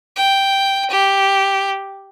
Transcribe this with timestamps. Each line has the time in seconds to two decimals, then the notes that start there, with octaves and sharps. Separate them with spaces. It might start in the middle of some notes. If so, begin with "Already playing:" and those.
0.16 G5
0.90 G4